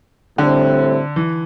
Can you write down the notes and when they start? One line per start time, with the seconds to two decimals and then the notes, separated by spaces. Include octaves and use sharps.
0.38 A2 D3 G3 C4 E4
1.16 E3